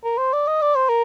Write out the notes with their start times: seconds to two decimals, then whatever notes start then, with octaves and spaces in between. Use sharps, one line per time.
0.04 A#4
0.18 C5
0.33 D5
0.47 D#5
0.62 D5
0.76 C5
0.89 A#4